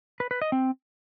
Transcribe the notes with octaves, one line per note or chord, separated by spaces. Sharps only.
B4
B4
D#5
C4